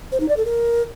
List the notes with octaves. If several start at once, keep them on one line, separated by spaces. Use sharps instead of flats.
C5
D#4
D5
A4
A#4